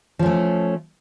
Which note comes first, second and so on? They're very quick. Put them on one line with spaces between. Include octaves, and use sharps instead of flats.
F3 C#4 A3